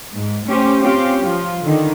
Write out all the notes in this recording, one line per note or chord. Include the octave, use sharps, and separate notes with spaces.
G#2
A3 C#4 G4 C5
C4 C#4 F4 G4
F3 F4
D3 D#3